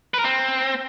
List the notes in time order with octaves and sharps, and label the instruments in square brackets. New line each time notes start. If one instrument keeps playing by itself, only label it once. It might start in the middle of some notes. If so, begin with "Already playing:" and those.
[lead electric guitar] B4
A#4
C4